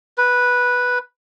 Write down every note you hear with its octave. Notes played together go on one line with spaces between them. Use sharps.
B4